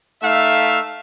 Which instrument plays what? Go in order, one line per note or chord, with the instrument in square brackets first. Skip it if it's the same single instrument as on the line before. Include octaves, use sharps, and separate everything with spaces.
[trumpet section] A3 D#4 E5 F5